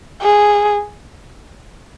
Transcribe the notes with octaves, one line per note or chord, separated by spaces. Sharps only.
G#4